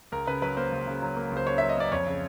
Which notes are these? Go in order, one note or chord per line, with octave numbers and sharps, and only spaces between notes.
C#2 A#4
C#3 B4
F#3 B4
A#3 C5
C#2
C#3
F#3
A#3
C#2
C5
C#3 C#5
F#3 E5
D#5
A#3 D5
F2 C#5
C#3